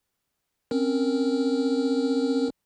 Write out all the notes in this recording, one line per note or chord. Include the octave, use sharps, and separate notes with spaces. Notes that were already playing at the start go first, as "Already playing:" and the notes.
C4 C#4 A#4